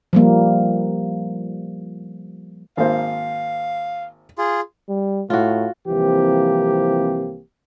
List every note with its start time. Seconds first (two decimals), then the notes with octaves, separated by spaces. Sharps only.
0.13 F3 G3 A#3
2.77 G#1 A#3 C5 F5
4.38 F4 G#4
4.89 G3
5.30 A2 F4 F#4
5.88 C2 E3 F3 A#3 C4 G4